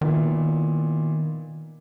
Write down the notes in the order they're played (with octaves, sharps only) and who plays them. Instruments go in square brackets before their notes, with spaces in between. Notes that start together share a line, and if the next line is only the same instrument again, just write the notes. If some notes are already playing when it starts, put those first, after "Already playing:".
[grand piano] A#2 B3 E4 [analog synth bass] D#3